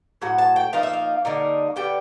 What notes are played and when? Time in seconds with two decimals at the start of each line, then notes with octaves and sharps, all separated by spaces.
0.22 A2 F#3 F#5
0.38 A5
0.56 G5
0.73 F3 A#3 D#4 F5
0.83 E5
0.93 F5
1.25 D3 G3 A#3 D#4
1.76 D3 G3 B3 G5